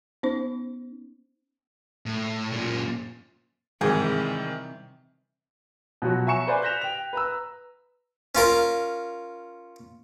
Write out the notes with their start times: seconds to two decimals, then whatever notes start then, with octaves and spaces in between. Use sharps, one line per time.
0.23 B3 C#4 D#4 C5
2.06 A2
2.53 F#2 A#2
3.81 G#2 C3 D#3 E3 G3 G4 G#4 D#5
6.02 B2 F3 F#3 F#4
6.27 E5 G#5 A#5 C#6 C#7 E7
6.47 B4 C5 D5 G#5 C6
6.62 F#6 G6 A#6 B6 E7 F7
6.81 G5 F7
7.13 B4 A#5 E6
8.35 C#4 F4 A#4